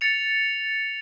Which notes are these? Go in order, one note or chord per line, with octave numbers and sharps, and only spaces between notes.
A6 C#7 F7